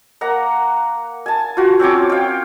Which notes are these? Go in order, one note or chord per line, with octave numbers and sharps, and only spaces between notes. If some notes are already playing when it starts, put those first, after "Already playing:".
A#3 F#5 A#5
G#5 A5
F4 F#4
C4 C#4 C#5 D6
F5 G5